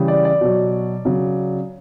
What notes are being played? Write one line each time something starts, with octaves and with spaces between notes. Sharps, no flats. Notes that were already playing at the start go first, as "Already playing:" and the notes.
Already playing: C#3 E3 G3
D5
D5
B2 F#3
C#3 F#3